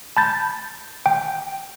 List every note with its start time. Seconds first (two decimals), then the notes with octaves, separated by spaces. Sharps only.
0.17 A5 B5 G6 A6
1.06 G5